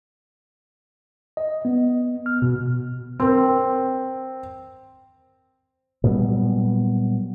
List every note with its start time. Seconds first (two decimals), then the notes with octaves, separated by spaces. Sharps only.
1.37 D#5
1.65 B3
2.26 F6
2.42 B2
3.20 C4 A#4
6.04 A#2 F#3 G3 B3